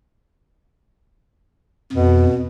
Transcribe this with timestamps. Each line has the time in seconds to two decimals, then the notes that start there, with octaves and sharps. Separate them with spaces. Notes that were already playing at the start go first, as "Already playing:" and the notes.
1.93 F2 B2